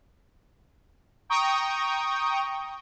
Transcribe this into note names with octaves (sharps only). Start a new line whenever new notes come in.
G5 A#5 C#6 D#6